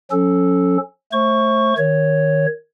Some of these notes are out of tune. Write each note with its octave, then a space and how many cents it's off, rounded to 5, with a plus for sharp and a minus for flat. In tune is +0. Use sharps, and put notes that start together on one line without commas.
F#3 -45 C#4 +0 A4 -5
A3 +0 C5 +35 C#6 +0
D#3 +0 C#5 +0